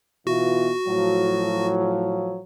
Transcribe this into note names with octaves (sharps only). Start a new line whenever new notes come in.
B2 E3 F4 F#4
A2 F3 F#3